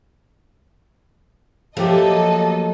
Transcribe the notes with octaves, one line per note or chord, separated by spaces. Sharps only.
F3 F#3 A3 A#3 G4 A4 D#5